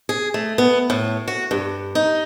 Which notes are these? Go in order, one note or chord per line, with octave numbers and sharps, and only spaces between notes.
G#4
A3
B3
A2
F#4
G2
D#4